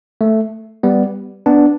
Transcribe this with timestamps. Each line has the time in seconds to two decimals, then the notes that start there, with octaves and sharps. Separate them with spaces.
0.21 A3
0.83 G3 B3
1.46 B3 D4